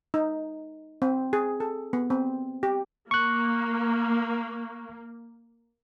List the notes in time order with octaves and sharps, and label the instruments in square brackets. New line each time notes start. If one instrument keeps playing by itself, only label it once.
[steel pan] D#4
C4
G#4
A4
B3
C4
G4
[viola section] A#3 [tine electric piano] C#6 F#6